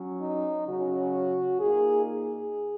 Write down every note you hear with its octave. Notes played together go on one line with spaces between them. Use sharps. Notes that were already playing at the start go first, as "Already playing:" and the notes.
Already playing: F#3 C#4
D#4
C#3 F#3 C#4 F#4
A#2 A#3 D#4 G#4
G#4